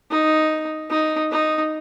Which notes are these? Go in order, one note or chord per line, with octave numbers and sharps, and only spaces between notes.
D#4
D#4
D#4